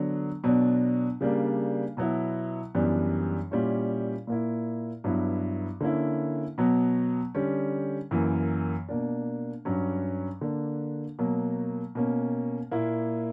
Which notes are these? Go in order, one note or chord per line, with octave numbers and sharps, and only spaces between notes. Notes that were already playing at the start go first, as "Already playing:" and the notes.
Already playing: D3 F#3 B3 D4
B2 F#3 B3 D4
C#3 G3 A#3 D4
B2 F#3 B3 E4
F#2 E3 G3 B3 D4
A#2 G3 C#4 E4
A#2 A#3 E4
G2 F#3 B3 E4
D3 A#3 C#4 E4
B2 F#3 B3
D3 G3 C#4
F#2 E3 A#3
B2 A#3 D4
G2 F#3 C#4
D3 A#3 D4
B2 F#3 A#3
B2 A#3 C#4
A#2 A#3 E4